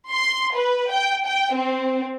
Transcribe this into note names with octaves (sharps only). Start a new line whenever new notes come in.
C6
B4
G5
G5
C4